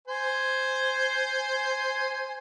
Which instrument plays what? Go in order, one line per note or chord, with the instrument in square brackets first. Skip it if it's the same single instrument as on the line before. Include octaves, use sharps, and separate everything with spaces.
[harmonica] C5 G#5 C6